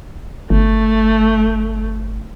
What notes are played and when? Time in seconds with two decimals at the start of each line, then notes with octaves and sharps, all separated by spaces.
0.50 G1 A3